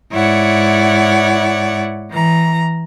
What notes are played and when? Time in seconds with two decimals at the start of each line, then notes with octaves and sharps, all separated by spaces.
0.14 G#2 E4 C#5 D5 F#5
2.11 E3 A#5